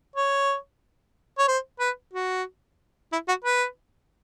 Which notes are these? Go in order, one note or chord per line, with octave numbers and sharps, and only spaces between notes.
C#5
C#5
C5
B4
F#4
E4
F#4
B4